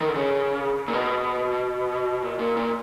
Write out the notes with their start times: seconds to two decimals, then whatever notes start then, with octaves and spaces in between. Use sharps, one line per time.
0.01 D#3
0.08 D3
0.15 C#3
0.88 A#2
0.93 B2
2.22 A#2
2.39 A#2
2.57 A#2